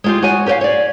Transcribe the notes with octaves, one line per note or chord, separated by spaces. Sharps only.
G#3 F4 G4
F#4 C#5 G#5
G4 A#4 C5 C#5 F5
C#5 D5